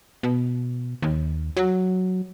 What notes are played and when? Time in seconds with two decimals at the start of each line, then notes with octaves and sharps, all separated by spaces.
0.23 B2
1.02 D#2
1.57 F#3